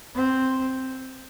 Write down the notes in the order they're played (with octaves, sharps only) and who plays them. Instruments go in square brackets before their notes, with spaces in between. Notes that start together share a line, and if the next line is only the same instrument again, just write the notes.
[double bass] C4